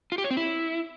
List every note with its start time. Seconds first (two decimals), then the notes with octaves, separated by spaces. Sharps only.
0.12 F4
0.18 G4
0.24 C#5
0.31 C4
0.37 E4